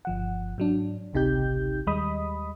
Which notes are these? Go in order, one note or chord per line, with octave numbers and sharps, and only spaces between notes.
G1 F3 F#5
G#2 F#3 D4
G#1 C#2 C3 D#4 G4 G6
D#2 G3 G#3 D#5 B5 D#6